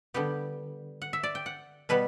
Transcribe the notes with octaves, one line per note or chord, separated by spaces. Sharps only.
D3 G3 B3 G4
F#5
E5
D5
G5
F#5
B2 G3 B3 B4